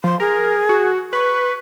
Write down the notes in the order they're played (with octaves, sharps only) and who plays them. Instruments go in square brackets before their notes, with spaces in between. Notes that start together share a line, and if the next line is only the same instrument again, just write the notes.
[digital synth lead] F3 [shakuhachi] C6
[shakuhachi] G#4 [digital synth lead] A#4
[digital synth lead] F#4
[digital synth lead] B4 [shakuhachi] C#6